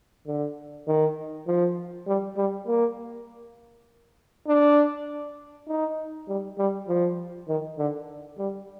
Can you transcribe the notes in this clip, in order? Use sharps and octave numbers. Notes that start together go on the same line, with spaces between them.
D3
D#3
F3
G3
G3
A#3
D4
D#4
G3
G3
F3
D#3
D3
G3